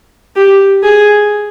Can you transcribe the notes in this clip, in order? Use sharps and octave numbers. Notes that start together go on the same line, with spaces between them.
G4
G#4